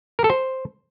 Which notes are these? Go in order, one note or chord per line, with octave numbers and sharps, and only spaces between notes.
A#4
A4
C5